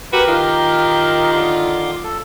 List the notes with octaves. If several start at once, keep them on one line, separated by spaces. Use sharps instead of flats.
F#4 G4 A#4 B4
D#3 F4
D3 C6 D6
A4